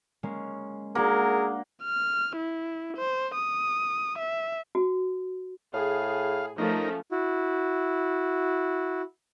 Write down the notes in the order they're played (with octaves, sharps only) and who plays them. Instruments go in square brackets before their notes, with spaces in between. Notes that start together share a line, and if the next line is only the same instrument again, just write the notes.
[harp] G#3 A#3 C#4
[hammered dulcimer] A#3 [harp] D4 F#4 F#5 [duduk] G#4 [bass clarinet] A#4
[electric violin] F6
E4
C5
D#6
E5
[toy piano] F#4
[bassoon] A2 [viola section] G#4 [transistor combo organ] F5
[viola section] F3 A3 C#4 [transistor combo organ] D#4 A#4
[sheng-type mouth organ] E4 F#4